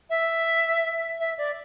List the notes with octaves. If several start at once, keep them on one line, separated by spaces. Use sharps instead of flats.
E5
E5
D5